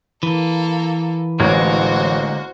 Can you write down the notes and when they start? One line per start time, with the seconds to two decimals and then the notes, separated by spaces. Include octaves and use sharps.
0.23 E3 A#3 A4
1.40 A1 D3 G#3 A#3 F#4 C5 C#5 G#6